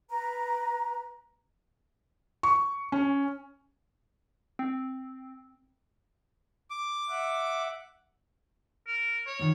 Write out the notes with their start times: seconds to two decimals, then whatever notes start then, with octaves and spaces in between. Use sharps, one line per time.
0.10 B4 A#5
2.43 C#6
2.92 C#4
4.59 C4
6.70 D6
7.09 E5 F#5
8.87 A#4
9.27 C#5
9.39 A#2 D#3